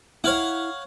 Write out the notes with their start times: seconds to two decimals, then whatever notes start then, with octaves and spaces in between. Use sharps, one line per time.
0.24 E4 C#5 F5 F#5